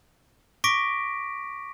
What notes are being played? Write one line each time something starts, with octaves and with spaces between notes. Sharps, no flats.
C#6 D6 A#6 B6 D7